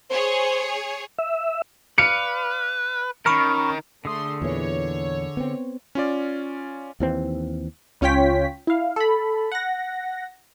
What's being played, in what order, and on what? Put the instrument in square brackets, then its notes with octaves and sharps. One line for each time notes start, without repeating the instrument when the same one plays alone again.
[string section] G#4 C#5 [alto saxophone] C5
[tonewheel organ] E5
[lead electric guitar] B4 [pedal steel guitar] D5 F5 [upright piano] C#7
[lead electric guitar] D#3 [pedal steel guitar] C#4 A#4 [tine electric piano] B5 C#6 F6
[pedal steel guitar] D3 G#4 D#6 [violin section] A3 C6
[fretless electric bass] E2 A#2 E3 [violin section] C#5
[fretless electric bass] B3 C4
[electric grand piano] C#4 F4 D5
[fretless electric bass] D#2 E3 C4
[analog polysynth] C#2 C#4 F4 C#5 G5 B6
E4 F5
A4 B5
F#5 A#6